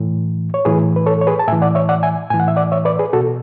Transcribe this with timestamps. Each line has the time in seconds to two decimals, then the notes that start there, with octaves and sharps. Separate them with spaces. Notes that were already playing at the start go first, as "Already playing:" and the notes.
Already playing: A2 E3
0.54 C#5
0.65 A2 E3 G#4 B4
0.96 B4
1.06 A4 C#5
1.21 C#5
1.27 G#4 B4
1.39 A5
1.48 A2 E3 E5 G#5
1.62 D5 F#5
1.75 C#5 E5
1.89 D5 F#5
2.03 E5 G#5
2.30 A2 E3 G#5
2.40 F#5
2.48 E5
2.56 D5 F#5
2.72 C#5 E5
2.85 B4 D5
2.99 G#4 B4
3.13 B2 F#4 A4